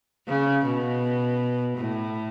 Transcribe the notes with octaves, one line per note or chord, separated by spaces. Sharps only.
C#3
B2
A2